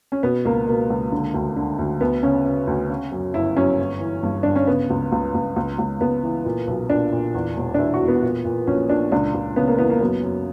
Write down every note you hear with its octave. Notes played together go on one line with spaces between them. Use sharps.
C#4
B2 B3
C#2 A#3
B2 A#3
C#2
D3
D2
D3
D2
D2 B3
C#3 C#4
C#3
D2
C#3
F#2
G1 E4
F#2 C#4
G1
E3
G2
G1 D4
C#4
C#3 B3
C#2
C#2
C#2
C#2
C#2
C#2 B3
E3
A#2
B1
A#2 D4
A#2
E2
E1
D4
E2 E4
F#4
E2
B3
A#2
A#2
A#1 C#4
A#2 D4
C#2 D4
C#2
C#3 B3
A#3
E3 B3
A#3
F#2 B3
F#2